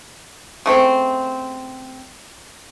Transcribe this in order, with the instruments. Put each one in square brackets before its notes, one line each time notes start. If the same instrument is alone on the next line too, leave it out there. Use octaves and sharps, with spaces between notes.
[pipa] C#3 A3 C4